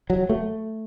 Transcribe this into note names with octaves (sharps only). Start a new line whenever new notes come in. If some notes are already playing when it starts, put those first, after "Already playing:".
F#3
A3